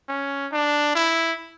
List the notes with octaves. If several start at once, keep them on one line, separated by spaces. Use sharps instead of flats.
C#4
D4
E4